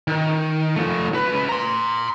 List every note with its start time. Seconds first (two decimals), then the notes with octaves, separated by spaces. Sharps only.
0.08 D#3
0.76 F3 A3
1.14 C#2 B4
1.49 A#5 C6